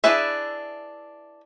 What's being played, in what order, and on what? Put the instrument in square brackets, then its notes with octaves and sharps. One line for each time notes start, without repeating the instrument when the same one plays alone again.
[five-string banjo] D4 E4 G#4 B4 E5